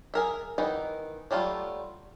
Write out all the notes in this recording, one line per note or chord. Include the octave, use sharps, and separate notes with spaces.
G#4 A#4 E5
D#3 E3 B3 D#4
F#3 G3 A3 F4